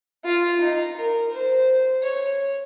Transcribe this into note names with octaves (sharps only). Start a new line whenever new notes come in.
F4
D#4
A#4
C5
C#5